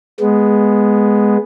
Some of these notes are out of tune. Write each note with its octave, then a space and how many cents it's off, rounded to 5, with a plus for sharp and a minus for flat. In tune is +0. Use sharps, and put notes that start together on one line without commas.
G#3 +0 B3 +0